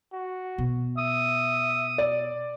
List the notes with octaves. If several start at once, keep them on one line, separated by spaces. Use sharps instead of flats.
F#4
B2
E5 D#6
D5